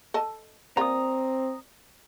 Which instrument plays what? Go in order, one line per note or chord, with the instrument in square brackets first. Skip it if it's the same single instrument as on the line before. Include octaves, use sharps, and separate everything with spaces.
[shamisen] A4 D#5 A5
[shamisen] G3 A#3 F4 [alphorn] C4 [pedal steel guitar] A#5 D#6